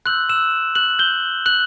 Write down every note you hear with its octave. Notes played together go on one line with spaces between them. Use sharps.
C6 E6 F#6 G6 F#7
E6 E7
F#6 F#7
G6 G7
F#6 F#7